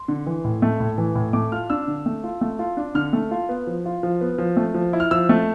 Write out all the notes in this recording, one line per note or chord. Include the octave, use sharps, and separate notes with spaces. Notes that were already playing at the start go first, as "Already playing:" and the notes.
Already playing: C6
D3
E3
A2
A3
A2
E3
A2
A3 D6
F4 F6
D4 E6
D3
A3
F4
A3
F4
D4
D3 F6
A3
F4
B3
F3
F4
F3
B3
F3
A3
F3
E4
F6
F3 E6
A3